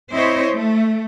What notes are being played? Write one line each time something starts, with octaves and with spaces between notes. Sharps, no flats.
C4 E4 C5 C#5 D#5
A3